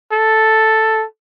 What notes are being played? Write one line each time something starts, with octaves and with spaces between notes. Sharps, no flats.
A4